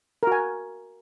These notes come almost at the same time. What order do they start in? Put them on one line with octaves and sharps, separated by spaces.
A#4 F#4 G#5